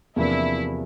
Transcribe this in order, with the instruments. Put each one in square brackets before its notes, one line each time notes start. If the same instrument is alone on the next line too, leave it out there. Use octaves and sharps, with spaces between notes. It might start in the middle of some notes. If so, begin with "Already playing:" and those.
[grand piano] E2 C3 F3 A#3 D4 [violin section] E4